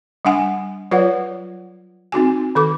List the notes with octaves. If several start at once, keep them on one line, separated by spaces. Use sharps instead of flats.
G3 D4 F#5 G#5
F#3 F4 B4 C#5 D5 F#5
C4 D#4 F#4 G#5
D#3 A4 D6